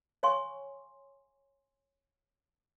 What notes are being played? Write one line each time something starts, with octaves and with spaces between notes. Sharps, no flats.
C#5 F5 G#5 C6 C#6